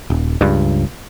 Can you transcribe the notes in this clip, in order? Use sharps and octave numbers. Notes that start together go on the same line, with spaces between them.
D#1
C#2 G2